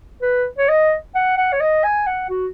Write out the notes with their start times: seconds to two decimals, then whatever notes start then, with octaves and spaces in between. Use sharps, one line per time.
0.22 B4
0.58 C#5
0.68 D#5
1.15 F#5
1.37 F#5
1.53 C#5
1.60 D#5
1.84 G#5
2.07 F#5
2.29 F#4